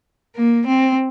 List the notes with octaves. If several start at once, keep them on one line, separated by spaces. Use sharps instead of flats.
A#3
C4